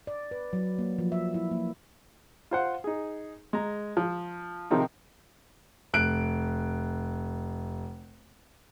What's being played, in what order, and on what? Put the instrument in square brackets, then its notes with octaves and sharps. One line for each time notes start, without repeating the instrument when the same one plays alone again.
[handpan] D5
B4
F#3
A#3
F3
E5
E4
A#3
[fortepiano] F4 C5 F#5
D#4 G#4
G#3 A#5
F3
C3 D#3 F3 C4 D#4
[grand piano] F1 F#6 D7